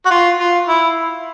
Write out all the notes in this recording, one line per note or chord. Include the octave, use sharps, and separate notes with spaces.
F#4
F4
F4
E4